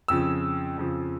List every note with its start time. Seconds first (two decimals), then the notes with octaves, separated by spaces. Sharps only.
0.08 F2 C#3 F3 E6
0.78 F2 C#3 F3